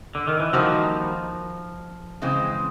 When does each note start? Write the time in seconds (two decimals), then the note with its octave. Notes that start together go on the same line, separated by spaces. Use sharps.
0.15 D3
0.28 D#3
0.40 E3
0.53 D#3 F3 G3 A#3 D#4 F#4
2.22 C#3 E3 G#3 C4